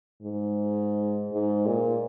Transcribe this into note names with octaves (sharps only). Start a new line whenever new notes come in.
G#2
G#2
A#2